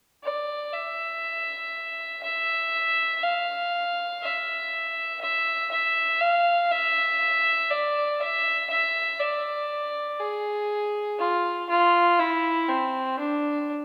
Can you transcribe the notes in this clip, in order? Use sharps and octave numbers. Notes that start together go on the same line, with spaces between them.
D5
E5
E5
F5
E5
E5
E5
F5
E5
D5
E5
E5
D5
G#4
F4
F4
E4
C4
D4